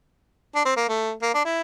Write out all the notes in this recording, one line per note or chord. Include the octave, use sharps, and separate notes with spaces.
D4
C4
A#3
A3
A#3
D4
E4